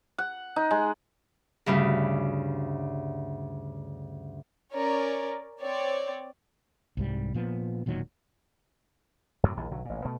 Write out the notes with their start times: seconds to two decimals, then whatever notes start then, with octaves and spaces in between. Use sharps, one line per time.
0.18 F#5
0.56 D#4
0.71 G#3
1.66 D2 G2 C#3 B4
4.73 C#4 A#4 C#5 D5
5.61 C4 C#5 D5
6.97 C2 G#2 G3
7.34 A#2 F3 B3
7.86 E1 A#2 D#3 F#3
9.43 F#2 A2 C3 F#3
9.57 A#1 D#2 E3
9.71 B1 D3 F#3
9.85 A1 A#2
10.05 B2 A3